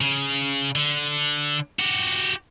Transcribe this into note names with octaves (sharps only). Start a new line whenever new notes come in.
C#3
D3
F#4 G4